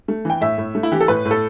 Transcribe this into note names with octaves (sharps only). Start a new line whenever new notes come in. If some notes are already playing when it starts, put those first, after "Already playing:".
A3
E3 G5
A2 E5
A2
A3
E4
E3 G4
A4
A2 B4
A2
A4